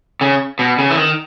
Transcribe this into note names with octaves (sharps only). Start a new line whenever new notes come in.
C#3
B2
C#3
E3
D#3